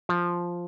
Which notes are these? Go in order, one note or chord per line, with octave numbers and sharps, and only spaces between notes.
F3